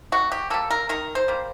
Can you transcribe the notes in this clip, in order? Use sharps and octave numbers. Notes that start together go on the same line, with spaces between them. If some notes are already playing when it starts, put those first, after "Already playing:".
D#3 F#4
G4
G3 A#3 A4
A#4
D#3 A#4
C5
G3 A#3